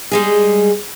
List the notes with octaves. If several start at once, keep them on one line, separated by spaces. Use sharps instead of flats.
G3 G#3 G#4